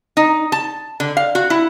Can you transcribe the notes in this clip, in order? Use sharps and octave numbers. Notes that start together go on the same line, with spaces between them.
D#4
A5
D3
F5
F#4
E4